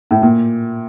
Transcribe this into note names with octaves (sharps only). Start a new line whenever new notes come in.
A2
A#2